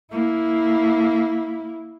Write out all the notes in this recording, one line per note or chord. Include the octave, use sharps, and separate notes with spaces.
A#3 E4